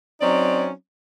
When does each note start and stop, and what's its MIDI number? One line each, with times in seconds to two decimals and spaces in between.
0.22 0.71 54
0.22 0.71 60
0.22 0.71 61
0.22 0.71 63
0.22 0.71 73
0.22 0.71 74